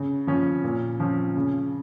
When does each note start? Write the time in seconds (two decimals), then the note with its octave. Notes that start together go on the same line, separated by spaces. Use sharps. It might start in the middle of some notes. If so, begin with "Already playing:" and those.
Already playing: C#3
0.27 F3 C#4
0.64 A#2
1.00 F3 C#4
1.36 C#3